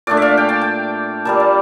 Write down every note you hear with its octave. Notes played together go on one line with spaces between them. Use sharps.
A#2 A3 D4 D5
E5 F5
G5
A5
G5
A#2 G3 A#3 A5
A5